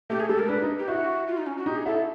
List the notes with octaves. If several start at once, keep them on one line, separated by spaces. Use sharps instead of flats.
A3 G4
G#4
G#3 A4
A#4
D4 B4
D#4
G4
E4 F#4
F4
D#4
C#4
F#4
D#4 G4
G#4
E4 A4